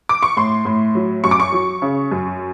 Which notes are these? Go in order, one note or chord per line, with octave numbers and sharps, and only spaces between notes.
D6
C#6
A2 C6
A2
F#3
F#2 C#6
D6
C#6
F#3
C#3
F#2